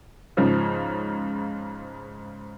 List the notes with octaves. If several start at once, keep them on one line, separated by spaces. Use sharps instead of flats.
G#2 C#3 F3 C#4